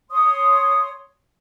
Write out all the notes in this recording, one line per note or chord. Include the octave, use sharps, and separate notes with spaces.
C#5 C6 D#6